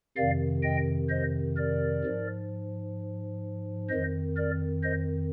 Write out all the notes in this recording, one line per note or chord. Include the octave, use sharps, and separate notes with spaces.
F2 C3 D#3 D5 F5
D#5 G5
C5 D#5
A#4 D5
G#2 F3
F2 D#3 C5 D#5
A#4 D5
C5 D#5